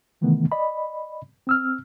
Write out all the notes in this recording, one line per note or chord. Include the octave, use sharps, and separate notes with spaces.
C3 D#3 E3 A3 B3
D5 D#5 B5
C4 E6 F6